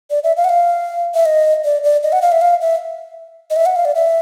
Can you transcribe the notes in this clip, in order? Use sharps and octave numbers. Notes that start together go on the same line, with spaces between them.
D5
E5
F5
F#5
F5
E5
D#5
D5
D5
D#5
F#5
F5
E5
F5
E5
D#5
E5
F#5
F5
D5
E5